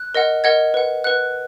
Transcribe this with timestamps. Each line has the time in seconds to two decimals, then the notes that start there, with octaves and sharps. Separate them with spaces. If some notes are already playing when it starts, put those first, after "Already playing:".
Already playing: F#6
0.15 A#4 D#5 F#5
0.44 A#4 D#5 F#5 G#6
0.74 B4 F#5
1.04 B4 F#5 F#6